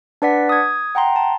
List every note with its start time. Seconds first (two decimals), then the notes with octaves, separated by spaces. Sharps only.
0.22 D4 B4 D5 F#5 B6
0.49 D#6 G#6
0.95 F#5 G5 A#5 C6
1.16 A5